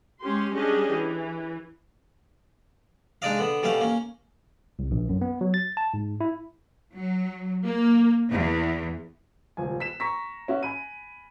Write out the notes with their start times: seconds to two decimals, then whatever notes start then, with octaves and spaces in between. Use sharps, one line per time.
0.21 G#3 C#4 G4 C6
0.53 G3 C#4 D4 G4 G#4 D#5
0.92 E3
3.22 G#3 D4 D#4 D5 D#5 F5
3.39 D3 B3
3.63 B2 G3 A3 C#4 F5
3.81 A#3 C#4
4.79 C2
4.91 A#1
5.09 F#2
5.21 B3
5.41 F#3
5.54 A6
5.77 A5
5.94 G#2
6.21 E4
6.95 F#3
7.65 A#3
8.30 E2
9.57 D#1 C#2 G#5
9.80 B6 E7
10.00 A#5 C#6 A#6 B6
10.48 C#4 F#4 E5
10.63 G#5 B5 D#7